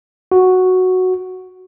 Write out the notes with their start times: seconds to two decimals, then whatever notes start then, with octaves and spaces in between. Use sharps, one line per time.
0.32 F#4